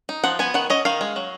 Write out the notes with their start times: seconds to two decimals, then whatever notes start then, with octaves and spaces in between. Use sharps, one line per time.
0.09 D#4
0.24 F3 F#5
0.39 B3 G#5
0.54 D#3 F#5
0.70 C#4 D#5
0.85 D#3 F5
1.01 G#3
1.16 F#3